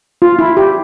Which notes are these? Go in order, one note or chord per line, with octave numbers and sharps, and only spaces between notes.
F4
E4
G4